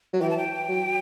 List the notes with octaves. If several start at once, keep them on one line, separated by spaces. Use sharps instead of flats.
F#3
E3 G5
A5
G5
F#3